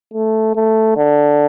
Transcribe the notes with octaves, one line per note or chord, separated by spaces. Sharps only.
A3
A3
D3